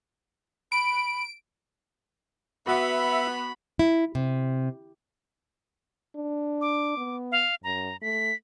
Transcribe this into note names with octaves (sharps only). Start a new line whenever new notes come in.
B5 D7
B3 F#4 E5 B5 E6
E4
C3
D4
D6
B3
F5
F#2 A#5
A3 B6